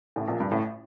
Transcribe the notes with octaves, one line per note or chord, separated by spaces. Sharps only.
A1 A2
A#1 A#2
G2
A1 A2